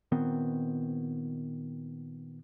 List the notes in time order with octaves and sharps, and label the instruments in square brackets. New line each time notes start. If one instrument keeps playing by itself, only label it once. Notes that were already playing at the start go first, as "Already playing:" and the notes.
[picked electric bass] A#2 D#3 B3 C4